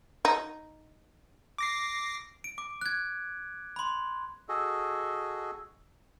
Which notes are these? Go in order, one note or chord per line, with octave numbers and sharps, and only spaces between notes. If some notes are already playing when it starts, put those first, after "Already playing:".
D#4
D6 A#6 C7
D7
D6
F#6 G#6
B5 C6
F#4 G#4 A4 D#5